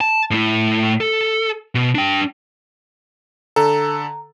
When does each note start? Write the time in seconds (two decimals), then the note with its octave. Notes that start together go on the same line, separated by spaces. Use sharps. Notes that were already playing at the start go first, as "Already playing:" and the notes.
0.01 A5
0.31 A2 E4
1.01 A4
1.75 B2
1.95 D4 G5
3.56 D3 A4 A#5